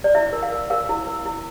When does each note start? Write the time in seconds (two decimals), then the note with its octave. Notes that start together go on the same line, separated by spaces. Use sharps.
0.04 D5
0.14 E4 E5
0.33 A#4
0.43 F5
0.52 A#4
0.70 A#4 F5
0.89 E4
1.07 A#4
1.25 E4